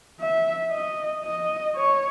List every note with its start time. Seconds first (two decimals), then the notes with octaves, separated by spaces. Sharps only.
0.20 E5
0.71 D#5
1.24 D#5
1.76 C#5